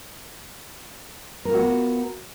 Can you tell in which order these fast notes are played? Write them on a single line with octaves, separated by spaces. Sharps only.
A#4 F4 F#4 B3